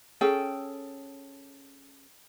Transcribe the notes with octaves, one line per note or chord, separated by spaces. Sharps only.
C#4 G#4 A4 G5